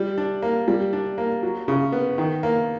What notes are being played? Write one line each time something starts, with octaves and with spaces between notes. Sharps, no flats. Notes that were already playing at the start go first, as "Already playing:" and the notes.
Already playing: G3
D4
A#3
G3
D4
A#3
F#3
C#3
B3
D#3
A#3